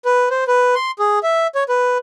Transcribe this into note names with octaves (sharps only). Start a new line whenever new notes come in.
B4
C5
B4
C6
G#4
E5
C#5
B4